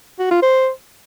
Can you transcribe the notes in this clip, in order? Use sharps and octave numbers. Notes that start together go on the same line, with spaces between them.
F#4
F4
C5